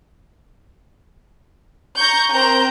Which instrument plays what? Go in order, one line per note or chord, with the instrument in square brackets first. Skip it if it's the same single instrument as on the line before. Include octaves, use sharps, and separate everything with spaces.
[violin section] A#5 C#6 G6
C4 A#4 A#5 G6